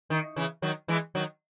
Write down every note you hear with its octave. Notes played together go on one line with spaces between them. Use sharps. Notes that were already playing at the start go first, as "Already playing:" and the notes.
D#3
C#3 E3
D#3 F#3
E3 G#3
D#3 F#3